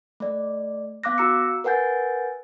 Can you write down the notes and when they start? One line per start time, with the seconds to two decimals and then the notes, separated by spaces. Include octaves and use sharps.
0.20 A3 D5
1.04 B3 F5 D6 F#6 A#6
1.18 F#4 A#5 E6 C#7
1.64 A#4 B4 F#5 G#5 G6 A6